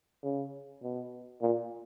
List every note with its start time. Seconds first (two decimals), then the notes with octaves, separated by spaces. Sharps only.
0.24 C#3
0.83 B2
1.42 A#2